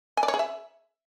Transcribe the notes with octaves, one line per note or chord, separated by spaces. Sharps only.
G#5
D5
C#5
G#4
E5